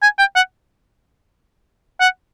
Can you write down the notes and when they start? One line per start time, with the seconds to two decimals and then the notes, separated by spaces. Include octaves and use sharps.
0.03 G#5
0.19 G5
0.36 F#5
2.00 F#5